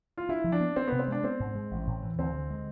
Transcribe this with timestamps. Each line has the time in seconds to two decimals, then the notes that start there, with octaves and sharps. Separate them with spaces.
0.18 F4
0.29 D4 E4
0.44 F3
0.52 D4
0.60 B3
0.76 C4 D4
0.87 C3 B3
0.99 C4
1.08 G#3 D4
1.24 B3 C4
1.40 G#2
1.55 G#3
1.71 A1
1.87 A2
2.02 E3
2.18 D2 C4
2.34 D3
2.50 G#3